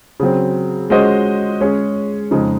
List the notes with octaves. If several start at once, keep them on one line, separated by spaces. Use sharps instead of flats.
C#3 F#3 C4
G#3 C#4 F#4 C5 D#5
G#3 C#4 G#4 C#5
F2 C#3 G#3 D#4